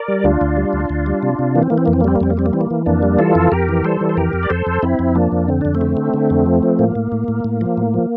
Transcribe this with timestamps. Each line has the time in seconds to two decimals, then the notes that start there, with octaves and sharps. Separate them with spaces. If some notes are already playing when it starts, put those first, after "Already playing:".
Already playing: A#4 D5
0.08 G3
0.24 D2 D4 F4
0.41 D2
0.57 G3
0.73 D2
0.90 D2
1.06 G3
1.23 C3
1.39 C3
1.55 E3 A#3
1.63 C4
1.70 E3 A#3
1.78 C4
1.86 F2 A#3
1.93 C4
2.01 A#3
2.04 G3 C4
2.16 A#3
2.20 F2 C4
2.30 A#3
2.37 G3 C4
2.46 A#3
2.53 E3 C4
2.61 A#3
2.70 E3
2.86 F2 A#3 D4
3.03 G3
3.18 E3 F4 A4
3.35 F2
3.52 F2 G4 A#4
3.69 E3
3.84 G3 A4 C5
4.01 E3
4.09 C5
4.17 F2 G4 A#4
4.33 F2
4.43 D5
4.50 F2 A4 C5
4.66 F2
4.83 F2 C4 E4
4.99 F2
5.15 F3 A#3 D4
5.32 F2
5.48 D3 C4
5.61 F2 D4
5.75 A3 C4
5.81 D3
5.97 D3
6.14 D3
6.30 F2
6.46 F3
6.63 F3
6.79 A2 A#3
6.95 A2
7.12 A2
7.28 A2
7.44 A2
7.61 F3
7.77 A2
7.94 F3